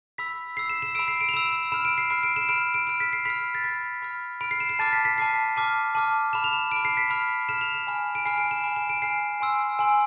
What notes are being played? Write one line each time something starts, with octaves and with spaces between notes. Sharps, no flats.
B5 E6 B6
B5 E6 C7
E7
E7
B5 E6 D7
C7
D7
F7
B5 E6 E7
E7
B5 F6 E7
D7
C7
B5 F6 C7
D7
E7
B5 F6 D7
D7
B5 F6 D7
B6
C7
B5 F6 B6
A6
B5 F6 B6
B5 F6
B5 F6 D7
C7
E7
C7
A5 D6 F6 A6
B6
B6
A5 D6 F6 C7
A5 D6 F6
A5 D6 F6
B5 F6 E7
F7
E7
F6 D7
B5
C7
B6
B5 F6
B5 F6 E7
F7
E7
G#5 B5 F6
D7
G#5 B5 F6 C7
D7
E7
G#5 B5 F6
E7
D7
G#5 B5 F6 C7
G#5 C6 E6
G#5 C6 E6